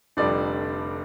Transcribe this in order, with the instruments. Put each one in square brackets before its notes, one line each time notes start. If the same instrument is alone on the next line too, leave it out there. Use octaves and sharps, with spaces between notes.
[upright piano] F1 F2 D3 G3 D4 D5